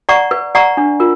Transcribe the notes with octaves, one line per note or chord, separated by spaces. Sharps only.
D5 F#5 A#5 C#6
B4
D5 F#5 A#5 C#6
D4
F4 A#4